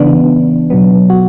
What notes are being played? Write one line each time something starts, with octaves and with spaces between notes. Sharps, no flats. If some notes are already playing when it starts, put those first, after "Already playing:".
Already playing: C#3 E3 B3 D4
B2 F#3 B3
F#4